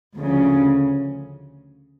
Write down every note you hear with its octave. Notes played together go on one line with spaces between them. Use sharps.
D2 C#3 F3